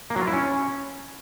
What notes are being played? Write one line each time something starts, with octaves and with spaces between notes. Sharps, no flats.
A#3
F#3
F4
E4
C#4